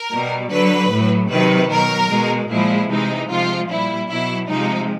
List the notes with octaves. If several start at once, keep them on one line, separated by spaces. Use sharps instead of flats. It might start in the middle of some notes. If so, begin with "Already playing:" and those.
Already playing: A#4
B2 G3
D3 F#3 B4
A2 F#3
C3 D#3 F#3 B4
B2 F#3 A#4
B2 G#3
A#2 F3 G#3 E4
C3 E3 G#3 D#4
C3 F3 G#3 F4
A#2 G3 E4
B2 F#3 E4
C3 F3 G#3 D#4